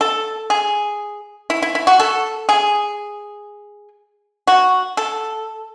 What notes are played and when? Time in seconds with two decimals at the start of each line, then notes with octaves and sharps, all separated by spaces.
0.01 A4
0.50 G#4
1.50 E4
1.62 E4
1.75 E4
1.87 F#4
2.00 A4
2.49 G#4
4.47 F#4
4.97 A4